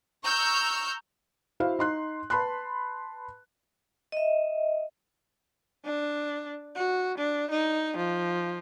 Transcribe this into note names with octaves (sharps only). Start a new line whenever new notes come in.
A#5 C#6 E6 F6 G6
E4 F#4 C5 F5
D#4 C6 F#6
B4 A5 B5 C6 F#6
D#5 E5
D4
F#4
D4
D#4
F3